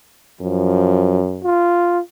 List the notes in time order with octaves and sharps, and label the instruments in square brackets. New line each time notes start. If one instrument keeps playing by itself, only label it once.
[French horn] F#2 [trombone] F3
[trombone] F4